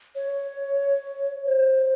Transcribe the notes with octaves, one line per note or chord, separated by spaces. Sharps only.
C#5
C5